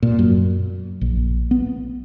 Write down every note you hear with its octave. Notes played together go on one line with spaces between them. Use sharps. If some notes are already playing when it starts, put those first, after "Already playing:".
A#2
F#2
A#1
B3